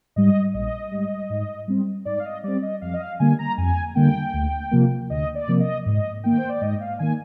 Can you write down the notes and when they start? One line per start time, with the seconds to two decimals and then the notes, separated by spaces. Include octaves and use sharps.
0.16 G#2 G3 D#5
0.54 A#1 D#5
0.91 G#2 G3
1.30 G#2
1.68 G3 C4
2.05 G#2 D5
2.19 F5
2.25 D#5
2.44 G3 C4 D5
2.62 D#5
2.81 F2 F5
2.94 D#5
3.00 F5
3.19 D3 G3 A#3 G#5
3.39 A#5
3.58 F2 G#5
3.95 D3 G3 A#3 G5
4.33 D2
4.71 C3 F3 A#3
5.10 D2 D#5
5.35 D5
5.48 C3 F3 A#3
5.60 D#5
5.86 G#2 D#5
6.23 D#3 A#3 G5
6.37 C5
6.49 D5
6.61 G#2 D#5
6.80 F5
6.99 D#3 A#3 G#5